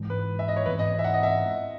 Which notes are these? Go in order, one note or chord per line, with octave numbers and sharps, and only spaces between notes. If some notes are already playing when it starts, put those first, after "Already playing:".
Already playing: G#2 E3 G#3
B4
E5
D#5
C#5
G#2 E3 B3 B4
D#5
E5
F#5
D#5
E5